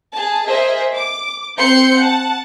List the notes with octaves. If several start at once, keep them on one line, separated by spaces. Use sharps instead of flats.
G#4 A5
G#4 A#4 C5 D#5 E5
D6
C4 C5 C6 G6 C#7
F#5 A5